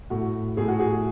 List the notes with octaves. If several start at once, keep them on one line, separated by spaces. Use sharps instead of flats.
A2 F#4
A2 G#4
F#4
G#4